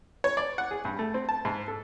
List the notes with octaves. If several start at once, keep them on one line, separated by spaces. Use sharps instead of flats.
C#5
D5
F#5
G#4
G2
A3
C4
A5
G#2
A4